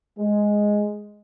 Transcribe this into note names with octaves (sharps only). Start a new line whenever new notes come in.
G#3